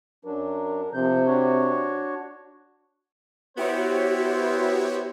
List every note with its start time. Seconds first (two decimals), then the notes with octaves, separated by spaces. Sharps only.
0.25 F#2 F#3 D4 A#4
0.94 C3 F3 G6
1.27 D4 F#4 C#5
3.57 B3 E4 F#4 G4 C5 C#5